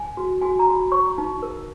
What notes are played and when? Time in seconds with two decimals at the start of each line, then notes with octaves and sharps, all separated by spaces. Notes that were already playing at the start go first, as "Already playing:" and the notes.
Already playing: G#5
0.17 F#4
0.41 F#4 G#5
0.59 A#5
0.67 F#4
0.75 B5
0.92 C#5 C#6
1.18 D#4
1.42 A#4